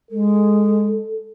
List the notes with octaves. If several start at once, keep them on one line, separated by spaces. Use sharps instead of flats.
G#3 A4